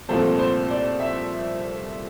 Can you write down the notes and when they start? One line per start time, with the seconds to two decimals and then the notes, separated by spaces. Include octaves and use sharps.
0.09 C2 A#2 F3 A3 C4 A4
0.39 C5
0.70 D5
1.00 E5